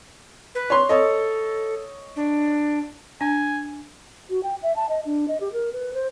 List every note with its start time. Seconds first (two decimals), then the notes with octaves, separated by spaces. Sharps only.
0.55 B4
0.70 C#5 C6
0.89 A4 C#5 D#5
2.16 D4
3.21 D4 G#5
4.30 F#4
4.43 G5
4.63 E5
4.76 A5
4.89 D#5
5.06 D4
5.28 D#5
5.41 G4
5.53 A#4
5.73 B4
5.94 C5